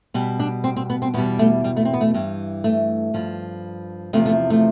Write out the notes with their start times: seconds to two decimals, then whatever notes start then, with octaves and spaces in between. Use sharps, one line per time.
0.14 B2 G3
0.40 D4
0.64 C4
0.76 C4
0.90 B3
1.02 C4
1.14 E2 B2 G3 B3
1.39 A3
1.64 G3
1.77 A3
1.85 C4
1.94 B3
2.01 A3
2.14 G2 E3 G3
2.64 A3
3.14 G2 F3
4.13 E2 C3 F3 A3
4.26 A3
4.50 A3